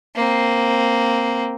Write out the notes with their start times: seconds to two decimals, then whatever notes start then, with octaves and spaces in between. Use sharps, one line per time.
0.15 A#3 C4